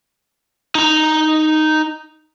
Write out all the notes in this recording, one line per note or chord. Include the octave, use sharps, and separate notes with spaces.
D#4 A#5